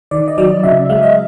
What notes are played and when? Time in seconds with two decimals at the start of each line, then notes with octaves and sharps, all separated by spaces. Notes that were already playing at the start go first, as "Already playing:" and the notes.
0.11 D#3 D5
0.28 D#5
0.38 F#3 D5
0.63 C#3 E5
0.89 G#3 F5
1.03 D#5